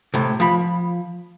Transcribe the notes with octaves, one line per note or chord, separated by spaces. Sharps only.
A2 C3
F3 B5